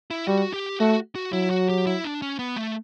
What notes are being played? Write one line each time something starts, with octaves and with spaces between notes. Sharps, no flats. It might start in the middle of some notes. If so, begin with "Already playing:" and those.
E4
G3 F#4
G4
A3 F#4
F#4
F#3 E4
F#4
G4
E4
D4
C#4
B3
A3